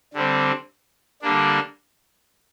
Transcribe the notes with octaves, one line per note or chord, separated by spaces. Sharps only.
D3 G3 C4
D3 G3 A#3 D4